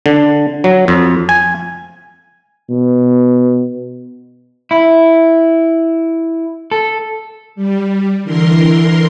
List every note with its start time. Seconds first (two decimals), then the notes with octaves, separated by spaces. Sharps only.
0.06 D3
0.64 F#3
0.88 F2
1.29 G#5
2.70 B2
4.71 E4
6.71 A4
7.55 G3
8.23 D3 E3 A#4 C6